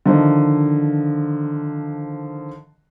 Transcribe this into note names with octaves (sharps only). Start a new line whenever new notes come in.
D3 D#3 F3 D#5